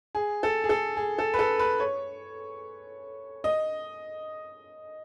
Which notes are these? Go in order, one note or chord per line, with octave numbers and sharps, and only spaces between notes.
G#4
A4
G#4
A4
G#4
A4
B4
A4
B4
C#5
D#5